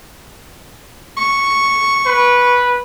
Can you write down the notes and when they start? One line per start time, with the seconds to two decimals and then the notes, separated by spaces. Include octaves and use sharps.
1.17 C#6
2.06 B4